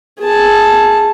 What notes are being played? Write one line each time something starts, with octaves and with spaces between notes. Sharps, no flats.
G#4 A5